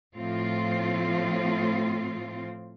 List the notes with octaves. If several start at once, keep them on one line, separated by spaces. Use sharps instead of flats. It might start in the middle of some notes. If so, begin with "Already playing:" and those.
A2 F3 C4 F4